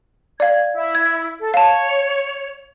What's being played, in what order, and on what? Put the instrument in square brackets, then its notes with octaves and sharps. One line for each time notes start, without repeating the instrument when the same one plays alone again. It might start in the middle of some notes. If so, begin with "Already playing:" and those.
[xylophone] D5 F5 [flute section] G#6
[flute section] E4
[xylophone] G#6
[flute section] A4
[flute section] C#5 [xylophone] F5 A5